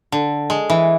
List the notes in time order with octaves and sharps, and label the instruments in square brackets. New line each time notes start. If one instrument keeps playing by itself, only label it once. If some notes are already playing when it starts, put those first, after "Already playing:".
[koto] D3
G#3
E3